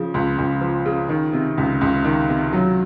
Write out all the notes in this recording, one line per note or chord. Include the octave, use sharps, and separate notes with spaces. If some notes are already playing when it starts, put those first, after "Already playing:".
Already playing: C#3 F3
C#2
C#2
F3
C#3
D#3
C3
C#2
C#2
D#3
C3
F#3